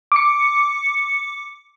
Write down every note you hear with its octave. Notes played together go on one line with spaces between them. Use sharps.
D6 C#7